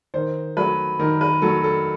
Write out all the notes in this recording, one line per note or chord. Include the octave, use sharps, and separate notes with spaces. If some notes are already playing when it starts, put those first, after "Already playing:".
D#3 C5
F#3 A3 B4
D#3 A#4
B4
F#3 A3 A4
A4